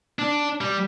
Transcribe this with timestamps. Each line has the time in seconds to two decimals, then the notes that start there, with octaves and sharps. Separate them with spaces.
0.19 D4
0.61 G3